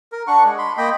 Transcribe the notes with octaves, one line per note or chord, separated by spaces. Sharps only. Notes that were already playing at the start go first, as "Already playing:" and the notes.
A#4
D4 F#5 C#6
G#3
B5 C6
A#3 D#5 G5 B5